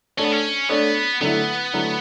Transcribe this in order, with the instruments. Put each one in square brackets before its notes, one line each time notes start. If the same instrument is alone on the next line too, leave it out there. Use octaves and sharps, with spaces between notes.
[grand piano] A3 D4 A4 C#5 [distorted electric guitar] C#4
[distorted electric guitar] B3
C#4
[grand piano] A3 D4 A4 C#5 [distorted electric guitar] B3
[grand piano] D3 F#3 A3 E4 [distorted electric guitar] B3
[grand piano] D3 F#3 A3 E4